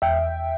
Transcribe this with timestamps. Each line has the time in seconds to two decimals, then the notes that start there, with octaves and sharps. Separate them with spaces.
0.02 E2 E5 G5